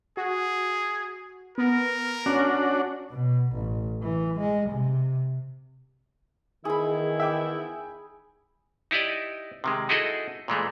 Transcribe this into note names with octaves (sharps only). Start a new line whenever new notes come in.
F#4 G#4
B3 A#4
C#4 D4 F#4
B2
A1
E3
G#3
C3
E2 D#3 E4 G#4 B5
E5 G5 D6
D#4 E4 G4 D5 D#5
C3 D#3 G#3
D#4 E4 F#4 G#4 A4 D#5
A#2 E3 G#3 A3